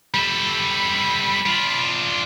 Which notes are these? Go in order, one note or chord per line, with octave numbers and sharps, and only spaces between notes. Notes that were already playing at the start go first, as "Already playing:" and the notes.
G3 A4 B5
D4 F4